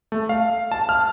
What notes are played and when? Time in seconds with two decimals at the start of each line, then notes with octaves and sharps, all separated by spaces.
0.12 A3
0.29 F5
0.71 A5
0.89 F6